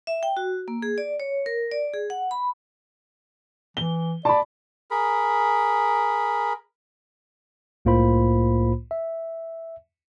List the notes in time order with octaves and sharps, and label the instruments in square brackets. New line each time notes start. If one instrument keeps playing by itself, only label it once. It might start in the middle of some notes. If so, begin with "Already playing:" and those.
[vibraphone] E5
G5
F#4
A#3
G#4
D5
C#5
A#4
D5
G#4
F#5
B5
[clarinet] E3 [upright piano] G7
[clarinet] D5 [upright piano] A5 B5
[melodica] G#4 A#4 B5
[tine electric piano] C2 A2 A#3 F4 C5 B5
E5